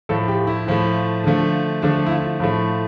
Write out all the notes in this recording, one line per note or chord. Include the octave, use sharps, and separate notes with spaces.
A2 F3 A3 A4
G4
E4
A2 F3 A3
D3 F3 A3
D3 F3 A3 D4
E4
F4
A2 F3 A3